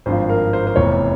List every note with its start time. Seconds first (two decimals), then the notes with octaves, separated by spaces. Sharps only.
0.06 G#1 G2 F3 C5
0.29 A#4
0.53 C5
0.67 C5
0.76 F1 E2 C3 C#5